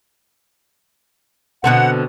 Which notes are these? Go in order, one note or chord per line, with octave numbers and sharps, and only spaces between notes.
B2 D3 C4 F#5